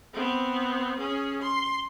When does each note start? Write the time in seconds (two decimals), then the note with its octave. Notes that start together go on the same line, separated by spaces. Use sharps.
0.13 B3 C4
0.99 C#4 G#4
1.42 C6